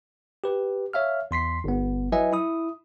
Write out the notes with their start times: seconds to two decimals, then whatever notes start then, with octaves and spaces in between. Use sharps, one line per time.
0.44 G4 B4
0.93 C#5 E5 F5 F6
1.31 E2 C6 B6 C7
1.64 G1 B3
2.12 F#3 E4 B4 D#5 E5 G#5
2.33 E4 D#6